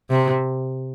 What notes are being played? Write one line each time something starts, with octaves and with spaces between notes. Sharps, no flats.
C3